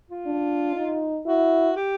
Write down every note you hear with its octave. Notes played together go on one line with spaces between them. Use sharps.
F4
D4
D#4
E4 F#4
G4